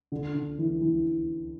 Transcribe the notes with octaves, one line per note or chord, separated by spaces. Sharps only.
D3
D3
E3
E3